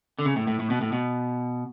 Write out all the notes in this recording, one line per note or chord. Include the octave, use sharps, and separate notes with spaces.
D3
C#3
A2
A2
A2
B2
A2
B2